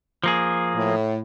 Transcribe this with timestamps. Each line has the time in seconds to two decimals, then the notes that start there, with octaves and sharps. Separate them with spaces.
0.24 F3 A#3 G#4
0.75 A2